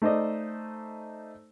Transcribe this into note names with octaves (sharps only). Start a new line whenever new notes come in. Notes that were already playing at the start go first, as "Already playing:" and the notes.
A3 D#4 C5 D5 D#5